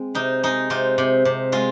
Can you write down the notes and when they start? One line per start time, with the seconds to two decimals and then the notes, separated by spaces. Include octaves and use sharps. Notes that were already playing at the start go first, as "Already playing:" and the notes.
Already playing: G#3 C4
0.15 C3 D#4
0.43 G#3 D#4
0.70 C3 F4
0.98 C3
1.25 C3
1.52 G#3 F4